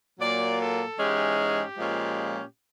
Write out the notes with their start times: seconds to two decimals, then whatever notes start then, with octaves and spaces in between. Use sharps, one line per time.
0.18 A#2 F#3 A#3 D5
0.58 A4
0.98 G#2 E3 G#3 C#4 G4
1.37 G4
1.77 A#2 F3 G#3 C#4